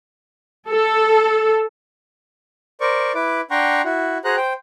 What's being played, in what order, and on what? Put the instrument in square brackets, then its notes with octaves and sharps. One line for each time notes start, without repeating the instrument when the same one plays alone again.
[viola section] A4
[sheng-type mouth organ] A#4 C5 D5 C#6
E4 B4 D6
D4 F#5 G5 A#5 C6 C#6
E4 F#4
F#4 G#4 C5 A#5 F#6
C5 G5